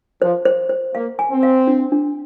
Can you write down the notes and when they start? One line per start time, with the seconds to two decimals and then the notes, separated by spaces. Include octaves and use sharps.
0.22 F3 C5
0.45 C5
0.69 C5
0.94 A#3 F5
1.19 G#5
1.31 C4
1.43 F5
1.67 D4
1.92 D4